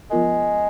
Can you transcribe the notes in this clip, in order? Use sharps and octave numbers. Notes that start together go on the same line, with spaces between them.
F3 G#3 B3 F4 A#4